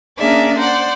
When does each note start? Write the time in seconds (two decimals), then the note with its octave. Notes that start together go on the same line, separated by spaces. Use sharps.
0.19 A#3 C#4 D4 G#4 D5 E5
0.59 C5 D5 F#5